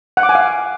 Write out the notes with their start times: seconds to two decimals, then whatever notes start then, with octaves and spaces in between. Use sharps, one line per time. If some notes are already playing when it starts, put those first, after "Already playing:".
0.17 F#5
0.23 D6
0.29 G#5
0.35 F5